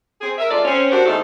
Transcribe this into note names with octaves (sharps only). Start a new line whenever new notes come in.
C4 G#4
A#4 E5
F2 G#3 F4 A4 D5
C4 C#4
D4 F#4 G4 A#4 C5
E2 G#2 A3 D#4 A4